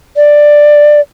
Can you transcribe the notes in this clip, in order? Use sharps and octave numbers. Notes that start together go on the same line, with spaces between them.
D5